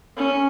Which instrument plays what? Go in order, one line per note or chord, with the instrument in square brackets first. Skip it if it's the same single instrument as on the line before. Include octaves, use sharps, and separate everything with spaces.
[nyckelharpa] C#4